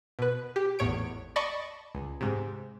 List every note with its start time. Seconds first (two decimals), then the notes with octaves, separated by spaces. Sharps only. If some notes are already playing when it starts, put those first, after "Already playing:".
0.19 B2 B4
0.56 G4
0.79 G#1 E2 A2 C#5 D7
1.36 D5 D#5 A5 B5 C#6
1.95 C#2
2.21 G#2 C3